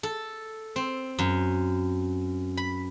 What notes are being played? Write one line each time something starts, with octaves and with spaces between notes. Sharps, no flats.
A4
C4
F#2
B5